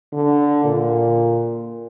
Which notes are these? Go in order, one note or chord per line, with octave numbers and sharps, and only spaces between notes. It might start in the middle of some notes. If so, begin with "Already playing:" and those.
D3
A#2